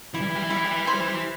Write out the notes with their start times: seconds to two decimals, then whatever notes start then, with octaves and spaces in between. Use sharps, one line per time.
0.14 E3 E4
0.21 G3
0.29 E3
0.36 G3
0.42 E3
0.50 G3 E4
0.57 E3
0.65 G3
0.71 E3
0.79 G3
0.86 E3 C5
0.93 G3
1.00 E3
1.08 G3
1.14 E3